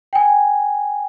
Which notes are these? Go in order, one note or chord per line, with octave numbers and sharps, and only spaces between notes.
G5 G#5